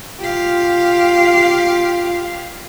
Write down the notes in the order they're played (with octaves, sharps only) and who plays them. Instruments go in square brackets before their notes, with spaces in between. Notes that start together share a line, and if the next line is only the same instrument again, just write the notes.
[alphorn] F4 [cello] G4 F5